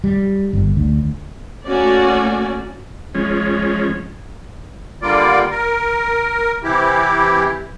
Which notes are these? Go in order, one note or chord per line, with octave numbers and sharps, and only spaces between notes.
G3
G1
D2
A3 A#3 C#4 F#4 D5
F3 G#3 C#4
D3 G3 A#3 F4 D5
A#4
C3 E3 E4 G4